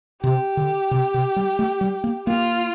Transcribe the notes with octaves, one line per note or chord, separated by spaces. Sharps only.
C3 G4
D3
C3
C3
G3
A3
G3
A#3
A#3 F4